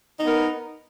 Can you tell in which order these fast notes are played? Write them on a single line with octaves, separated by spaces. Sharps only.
D#4 B3 A#4